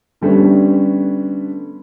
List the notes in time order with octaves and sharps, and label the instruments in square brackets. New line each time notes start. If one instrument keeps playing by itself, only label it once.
[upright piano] D3 G3 A3 B3 C#4